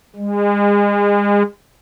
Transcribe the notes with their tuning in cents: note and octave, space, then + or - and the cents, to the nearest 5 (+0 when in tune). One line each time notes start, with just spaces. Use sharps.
G#3 -35